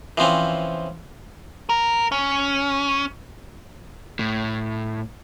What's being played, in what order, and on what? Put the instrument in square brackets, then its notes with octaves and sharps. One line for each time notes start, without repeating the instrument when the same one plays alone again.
[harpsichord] E3 F3 C4 C#4
[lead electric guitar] A#4
C#4
[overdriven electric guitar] A2